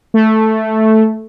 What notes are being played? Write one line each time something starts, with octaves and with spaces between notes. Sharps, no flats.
A3